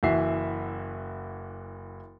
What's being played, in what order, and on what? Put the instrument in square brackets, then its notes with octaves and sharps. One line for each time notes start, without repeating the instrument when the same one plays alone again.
[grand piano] F#1 E3 F#4 E5 C7